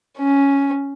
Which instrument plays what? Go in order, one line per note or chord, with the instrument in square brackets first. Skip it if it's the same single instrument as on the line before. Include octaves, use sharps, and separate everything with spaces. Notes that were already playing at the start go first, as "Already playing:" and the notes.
[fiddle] C#4